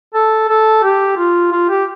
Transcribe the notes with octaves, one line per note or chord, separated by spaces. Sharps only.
A4
A4
G4
F4
F4
G4